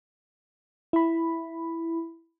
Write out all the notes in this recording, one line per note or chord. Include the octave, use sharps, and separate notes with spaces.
E4 B5